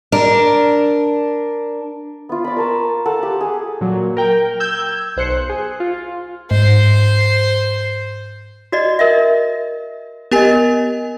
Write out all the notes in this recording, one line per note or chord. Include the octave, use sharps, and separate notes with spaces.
D4 A#4
B3 F4
D5 B5
A#4 A5 C#6
A4 F5 F#5 A5
G4 F#5
G#4
A#2 F#3
A#4 G5
E6 G6 G#6
B1 C5 F#6 C#7
G#4
F4
G#2 C5
F#4 D5 D#5
A#4 D#5 E5
B3 G4 A#4 D#5 G#5